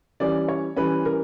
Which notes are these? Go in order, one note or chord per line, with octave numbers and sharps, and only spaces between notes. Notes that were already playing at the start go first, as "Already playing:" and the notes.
E3 G3 C#4 D5
C#5
E3 G3 C#4 B4
A#4